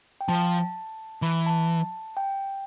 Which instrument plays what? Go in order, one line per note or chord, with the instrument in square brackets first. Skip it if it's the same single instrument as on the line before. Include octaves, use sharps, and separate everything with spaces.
[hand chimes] G5
[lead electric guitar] F3 [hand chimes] A5
[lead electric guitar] E3 [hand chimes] B5
[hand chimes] A5
G5